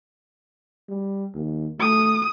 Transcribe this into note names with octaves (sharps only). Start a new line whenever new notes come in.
G3
D#2
A3 D#6